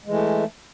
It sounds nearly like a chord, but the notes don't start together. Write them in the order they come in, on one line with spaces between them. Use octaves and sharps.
G#3 E3 A3